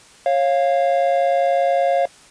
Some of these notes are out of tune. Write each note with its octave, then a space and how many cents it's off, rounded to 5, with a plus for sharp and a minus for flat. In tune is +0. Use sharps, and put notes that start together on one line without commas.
C#5 -20 F5 +0